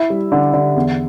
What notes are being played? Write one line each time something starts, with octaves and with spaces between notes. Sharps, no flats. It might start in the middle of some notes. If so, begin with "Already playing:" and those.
Already playing: E4 E5
G3
D3
D3
E2